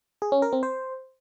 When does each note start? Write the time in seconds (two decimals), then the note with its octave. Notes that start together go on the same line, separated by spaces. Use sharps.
0.22 G#4
0.32 C#4
0.42 A#4
0.53 C4
0.63 C5